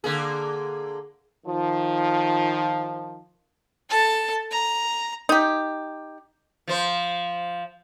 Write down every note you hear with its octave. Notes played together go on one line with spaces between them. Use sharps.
D3 A#3 G#4
D#3 F3
A4 A5
A#5
D#4 G4
F3 C5